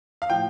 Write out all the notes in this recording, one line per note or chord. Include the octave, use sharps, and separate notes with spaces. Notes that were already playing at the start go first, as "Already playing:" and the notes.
F5
A2 F3 G5